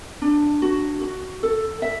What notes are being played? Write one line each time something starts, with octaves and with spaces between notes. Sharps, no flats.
D4
F#4
F#4
A4
E5